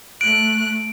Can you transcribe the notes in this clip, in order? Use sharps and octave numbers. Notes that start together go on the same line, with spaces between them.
A3 F#6 D7